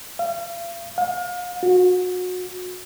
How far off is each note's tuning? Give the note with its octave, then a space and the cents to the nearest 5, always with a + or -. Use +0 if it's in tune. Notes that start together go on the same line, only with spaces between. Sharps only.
F5 -40
F5 +35
F#4 -30